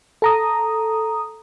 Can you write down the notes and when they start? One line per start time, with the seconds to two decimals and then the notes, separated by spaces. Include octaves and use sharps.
0.22 A4 A#5 D#6